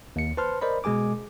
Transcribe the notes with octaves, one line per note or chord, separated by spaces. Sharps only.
D#2 C#7
B4 C5 A5 C6 F6
A#4 C5 D5 D#5 B5
B2 G#3 G#4 G#5 D6